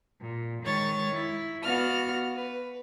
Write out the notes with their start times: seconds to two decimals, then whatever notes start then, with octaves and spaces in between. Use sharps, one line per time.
0.19 A#2
0.62 D#3 G#3 C#5 C#6 A6
1.13 E4
1.63 B3 F#4 D5 F5 F6
2.36 B4